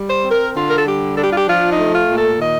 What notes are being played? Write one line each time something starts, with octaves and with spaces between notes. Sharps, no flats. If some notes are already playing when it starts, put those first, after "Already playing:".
Already playing: G3
C5
C4
A#4
D3 F4
A#4
A4
G3 G4
D4 A4
G4
F4
G4
F3 F4
D#4
A3
F4
A#2
A4
D#3 D#5